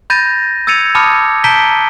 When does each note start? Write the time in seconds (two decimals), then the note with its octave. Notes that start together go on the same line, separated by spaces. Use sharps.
0.10 B5 G6 A6 A#6 D#7
0.67 E6 G#6 A6 C#7 D#7 F7
0.95 A5 B5 D6 D#6 F6 C#7
1.44 A5 A#5 G6 B6 D7 G7